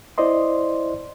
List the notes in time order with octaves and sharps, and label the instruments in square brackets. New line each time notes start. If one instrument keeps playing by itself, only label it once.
[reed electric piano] E4 C5 D5 D#5 C6